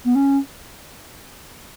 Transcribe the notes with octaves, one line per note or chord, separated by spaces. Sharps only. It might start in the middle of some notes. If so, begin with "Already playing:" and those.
B3
C#4